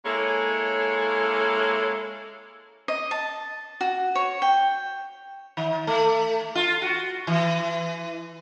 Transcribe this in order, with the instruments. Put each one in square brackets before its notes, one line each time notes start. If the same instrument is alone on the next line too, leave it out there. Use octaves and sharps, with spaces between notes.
[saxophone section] G#3 A#3 C#4 E4 A4 C#5
[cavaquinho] D#5
A5
F#4
C#5
G5
[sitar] D#3
A3
F4
F#4
E3